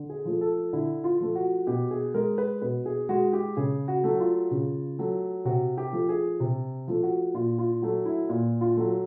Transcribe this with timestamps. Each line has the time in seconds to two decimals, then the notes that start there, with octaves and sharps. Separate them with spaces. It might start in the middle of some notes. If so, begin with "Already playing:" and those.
Already playing: D3
0.10 G#4
0.25 F3 A3
0.41 A4
0.73 D3 E4
1.04 F4
1.20 F3 A3
1.35 F#4
1.67 B2 G4
1.91 G#4
2.14 G#3 A#4
2.38 B4
2.62 B2 B4
2.86 G#4
3.09 G#3 F#4
3.33 G4
3.57 C#3 G#4
3.88 F#4
4.04 F#3 A3
4.20 F4
4.51 C#3
4.99 F#3 A3
5.45 C3 F#4
5.78 G4
5.93 F3 A3
6.09 G#4
6.40 C3
6.88 F3 A3
7.03 F#4
7.34 A#2 F4
7.58 F4
7.82 F#3 A3
8.05 E4
8.29 A#2 F4
8.61 F4
8.77 F#3 A3